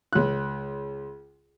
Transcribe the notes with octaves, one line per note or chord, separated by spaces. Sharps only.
C#2 F#6